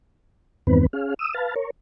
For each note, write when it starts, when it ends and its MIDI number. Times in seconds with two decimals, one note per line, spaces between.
0.67 0.86 40
0.67 0.86 43
0.67 0.86 51
0.67 0.86 59
0.67 0.86 60
0.67 0.86 71
0.93 1.14 61
0.93 1.14 68
0.93 1.14 77
1.19 1.34 87
1.19 1.34 88
1.34 1.54 71
1.34 1.54 77
1.34 1.54 81
1.56 1.70 70
1.56 1.70 73